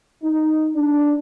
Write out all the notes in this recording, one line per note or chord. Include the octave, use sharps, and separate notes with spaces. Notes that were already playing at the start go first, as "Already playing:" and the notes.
D#4
D4